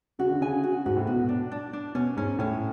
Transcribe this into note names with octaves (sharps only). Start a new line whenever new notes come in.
C#3 F#4
D3
C#3 G#5
F#4
G#2 F#4
A2
B2 F#4
D4
D4
D4
B2 C#4
G#2 C#4
A2 C#4